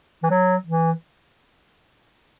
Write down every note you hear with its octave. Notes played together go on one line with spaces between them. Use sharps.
E3
F#3
E3